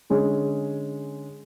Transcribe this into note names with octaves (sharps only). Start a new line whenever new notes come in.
D3 G#3 C#4 G#4